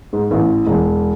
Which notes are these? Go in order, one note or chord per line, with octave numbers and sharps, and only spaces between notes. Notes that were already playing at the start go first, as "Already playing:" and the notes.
G#2
A1
E1